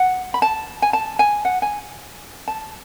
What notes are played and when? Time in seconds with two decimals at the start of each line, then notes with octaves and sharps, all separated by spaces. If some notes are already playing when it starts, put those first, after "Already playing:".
Already playing: F#5
0.34 B5
0.42 A5
0.82 G#5
0.93 A5
1.19 G#5
1.45 F#5
1.62 G#5
2.48 A5